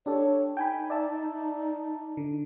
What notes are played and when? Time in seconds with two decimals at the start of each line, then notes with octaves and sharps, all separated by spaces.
0.06 D4 G4 A4 C#5
0.57 D#4 G5 G#5 B5
0.90 D5 E5 A5
2.17 D3